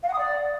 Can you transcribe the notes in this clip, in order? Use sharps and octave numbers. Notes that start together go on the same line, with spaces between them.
F5
F#5
D#6
D5